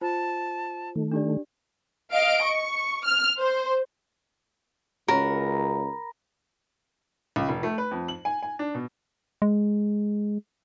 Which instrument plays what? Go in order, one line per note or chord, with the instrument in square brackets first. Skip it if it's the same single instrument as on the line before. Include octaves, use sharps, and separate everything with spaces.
[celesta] F4 C5 [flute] A5
[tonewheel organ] D#3 A3
[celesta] D4 G4 D5
[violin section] D#5 F5 D7
C#6
F6
C5
[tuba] C#2 [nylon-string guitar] C#4 F#4 [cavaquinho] A#4 [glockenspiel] A#5 B5 A#6
[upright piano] C#2
F1
A3
B4
F2
F#7
G#5
G#5
D4
B2
[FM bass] G#3